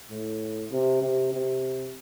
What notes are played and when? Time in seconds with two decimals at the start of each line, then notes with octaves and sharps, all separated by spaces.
0.11 A2
0.72 C3
1.02 C3
1.33 C3